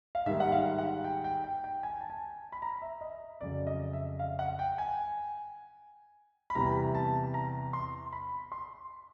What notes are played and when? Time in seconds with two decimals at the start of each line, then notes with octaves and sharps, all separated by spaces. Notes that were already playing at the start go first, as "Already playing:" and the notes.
0.15 F5
0.26 G#2 D#3 G3 A#3 E5
0.40 F#5
0.52 F5
0.78 F#5
1.04 G5
1.24 G5
1.44 G5
1.64 G5
1.83 G#5
2.01 A5
2.10 G#5
2.52 B5
2.62 A#5
2.82 E5
3.01 D#5
3.41 F2 C#3 F#3 D5
3.67 D#5
3.93 E5
4.19 F5
4.39 F#5
4.59 G5
4.78 G#5
6.50 B5
6.55 E2 C3 E3 G3 A#5
6.95 A5
7.34 A#5
7.73 C6
8.12 B5
8.52 C6